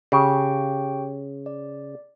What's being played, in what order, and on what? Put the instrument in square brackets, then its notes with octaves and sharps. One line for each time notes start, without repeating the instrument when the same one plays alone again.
[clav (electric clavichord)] C#3 [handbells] G4 G5 C#6
[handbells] D5